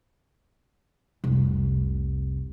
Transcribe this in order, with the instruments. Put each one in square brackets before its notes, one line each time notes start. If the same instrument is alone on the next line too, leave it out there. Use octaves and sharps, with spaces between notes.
[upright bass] F1 C2